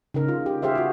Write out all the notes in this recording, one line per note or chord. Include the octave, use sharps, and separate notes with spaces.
C#3 D#4 A#4
F4
G4
G4 G#4 C5 E5 F5
F4 F#4